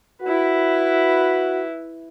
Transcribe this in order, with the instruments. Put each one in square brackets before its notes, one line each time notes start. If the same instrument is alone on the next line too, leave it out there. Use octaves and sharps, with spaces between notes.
[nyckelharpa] E4 B4 [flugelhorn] F#4